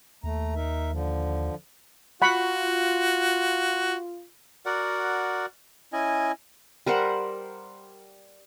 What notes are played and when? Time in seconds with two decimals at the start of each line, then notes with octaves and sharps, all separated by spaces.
0.23 D#2 A3 A#5
0.55 D#4 A#4 E5
0.91 D3 F3
2.22 F4 F#4 F#5 B5 C#6
4.65 F#4 A#4 D5 F#5
5.93 C#4 E4 D#5 G#5
6.86 G3 A#4 C5 F#5